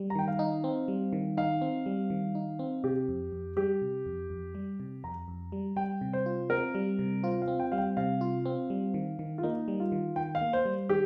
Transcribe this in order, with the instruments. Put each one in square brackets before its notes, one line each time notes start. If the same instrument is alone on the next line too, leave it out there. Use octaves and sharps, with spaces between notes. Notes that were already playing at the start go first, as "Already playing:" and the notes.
Already playing: [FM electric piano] G3
[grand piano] A#5
[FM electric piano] D#3 [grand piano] G5
[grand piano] F5
[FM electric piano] D#4
C4
G3
D#3
[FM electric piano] D#4 [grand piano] F5
[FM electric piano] C4
G3
D#3
D#4
C4
[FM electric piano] C3 [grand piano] G4
[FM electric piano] F2
F2
[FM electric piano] G3 [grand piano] G4
[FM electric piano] C3
F2
F2
G3
C3
[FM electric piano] F2 [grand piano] A#5
[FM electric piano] F2
G3
[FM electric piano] G3 [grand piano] G5
[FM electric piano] C3
[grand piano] C5
[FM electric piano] F4
[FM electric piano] C4 [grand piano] A#4
[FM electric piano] G3
C3
[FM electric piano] F4 [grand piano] C5
[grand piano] F5
[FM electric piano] C4
[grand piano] G5
[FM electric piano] G3 [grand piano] F5
[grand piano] G5
[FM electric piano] C3 [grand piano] F5
[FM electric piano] F4
C4
G3
D#3
D#3
[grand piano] F4
[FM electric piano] A#3 [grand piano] D#4
[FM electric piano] G3
[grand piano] F4
[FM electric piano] D#3
[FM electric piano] D#3 [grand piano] G5
[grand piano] F5
[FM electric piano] A#3
[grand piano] C5
[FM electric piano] G3
[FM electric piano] D#3 [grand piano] G4